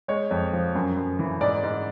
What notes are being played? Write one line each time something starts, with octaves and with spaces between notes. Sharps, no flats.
G#3 C#5
F2
F3
F#2
F#2
E3
G#2 D5
G#2